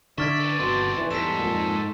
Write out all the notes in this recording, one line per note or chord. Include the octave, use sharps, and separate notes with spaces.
D3 D4 D5 E5 C#6 F6 G#6
A4 B4
G1 B2 C4 A4 C6
E3
E2 G#2 G3 A4 B6 E7
F2 A#2